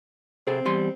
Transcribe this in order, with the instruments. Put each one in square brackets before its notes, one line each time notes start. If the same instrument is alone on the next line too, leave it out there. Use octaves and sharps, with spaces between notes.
[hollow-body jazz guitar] C3 G#4 A4 [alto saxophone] C4
[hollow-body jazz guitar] E2 G3 C6